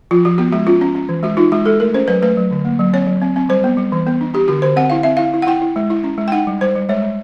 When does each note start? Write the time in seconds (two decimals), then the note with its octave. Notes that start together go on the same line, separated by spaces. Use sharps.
0.11 F3 F4
0.25 F3 F#4
0.38 B3 F#4
0.52 G#3 F#4
0.67 C#4 F4
0.81 C#4
0.95 C#4
1.09 E3
1.23 G#3 F#4
1.37 D#4 F4
1.52 G#3 F#4
1.66 G#3 A4
1.80 A3 A#4
1.94 C#4 C5
2.08 F#3 B4
2.22 A3 B4
2.37 F#3
2.51 D3
2.65 A#3
2.79 F#3
2.93 C4 C#5
3.07 F#3
3.22 C4
3.36 C4
3.49 G3 C5
3.64 B3
3.77 G3
3.92 E3
4.07 B3
4.21 D4
4.34 D4 G4
4.48 D3 F#4
4.62 D3 C5
4.76 C4 F#5
4.90 E4 F5
5.03 C4 E5
5.17 E4 F5
5.34 E4
5.42 F#5
5.47 E4 G5
5.62 E4
5.76 G#3
5.90 E4
6.04 C#4
6.18 G#3
6.28 G5
6.32 D#4 F#5
6.47 G3
6.61 G3 C5
6.75 G3
6.89 G#3 C#5
7.02 G#3